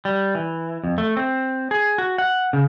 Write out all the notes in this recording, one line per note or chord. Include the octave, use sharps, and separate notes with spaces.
G3
E3
F2
A3
C4
G#4
F#4
F#5
C#3